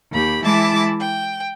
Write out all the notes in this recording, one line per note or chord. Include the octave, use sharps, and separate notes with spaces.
D#2 G4 B5
E3 G#3 E4 A5 D6
G5